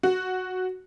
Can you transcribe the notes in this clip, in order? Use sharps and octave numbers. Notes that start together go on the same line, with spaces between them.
F#4